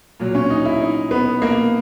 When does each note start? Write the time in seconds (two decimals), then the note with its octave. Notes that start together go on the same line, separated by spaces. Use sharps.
0.20 A#2 F#3
0.35 C#4
0.50 D#4
0.65 E4
0.81 D#4
1.11 B3
1.42 A#3